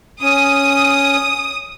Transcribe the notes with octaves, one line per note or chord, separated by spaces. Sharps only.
C#4 D#6